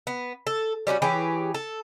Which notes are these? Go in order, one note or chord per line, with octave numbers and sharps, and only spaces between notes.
B3
A4
G3 C#4 F4 F#4
E3 G4 G#4 C#5
A4